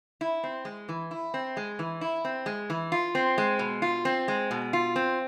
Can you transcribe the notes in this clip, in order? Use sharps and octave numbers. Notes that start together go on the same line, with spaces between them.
E4
C4
G#3
E3
E4
C4
G#3
E3
E4
C4
G#3
E3
F4
C4
G#3
B2
F4
C4
G#3
B2
F4
C4